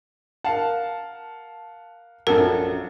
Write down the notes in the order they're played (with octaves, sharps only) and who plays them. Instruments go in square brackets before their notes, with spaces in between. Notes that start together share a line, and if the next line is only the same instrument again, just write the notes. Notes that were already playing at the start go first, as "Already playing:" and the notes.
[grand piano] A#4 F5 F#5 [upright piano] A5
[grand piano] A#1 F#2 [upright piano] F#4 A4 [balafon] A#4